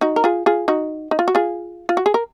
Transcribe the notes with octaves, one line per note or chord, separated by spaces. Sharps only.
D#4 F#4
A#4
F4 G#4
F4 G#4
D#4 F#4
D#4
F4
F#4
F4 G#4
F4
F#4
G#4
A#4